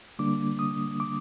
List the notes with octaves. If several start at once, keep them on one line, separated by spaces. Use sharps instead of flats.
D3 G3 A#3 D4 D6
D#6
D6